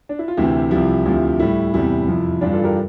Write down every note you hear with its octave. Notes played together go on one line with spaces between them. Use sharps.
D4
E4
F4
D2 C3 E3 E4 G4
C2 C3 F3 E4 G4
D2 C3 F3
A2 G3 E4
E2 C3 G3 E4
F2 C3 F3
G2 E3 G3 D4 F4
F4 A4
G4 A#4